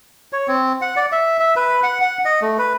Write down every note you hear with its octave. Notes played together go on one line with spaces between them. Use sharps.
C#5
C4
F#5
D5
E5
E5
B4
F#5
F#5
D#5
A3
B4